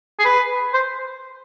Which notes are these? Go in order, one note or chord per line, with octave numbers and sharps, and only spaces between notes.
G#4
B4
C5